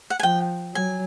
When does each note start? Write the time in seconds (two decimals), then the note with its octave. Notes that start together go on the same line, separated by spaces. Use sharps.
0.10 F#5
0.19 G#5
0.23 F3 G5
0.74 F#3 G#5